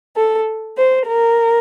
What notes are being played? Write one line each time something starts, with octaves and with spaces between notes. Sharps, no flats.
A4
C5
A#4